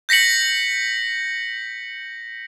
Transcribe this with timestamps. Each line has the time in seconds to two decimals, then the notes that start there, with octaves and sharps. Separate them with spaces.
0.09 G6 A#6 B6 C#7 F#7